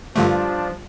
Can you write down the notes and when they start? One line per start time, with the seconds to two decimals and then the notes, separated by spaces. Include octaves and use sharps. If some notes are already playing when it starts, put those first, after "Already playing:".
0.16 G2 D3 F3 G3 A3 D4 F4